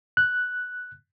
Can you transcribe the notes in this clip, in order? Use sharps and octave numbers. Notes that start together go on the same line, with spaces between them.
F#6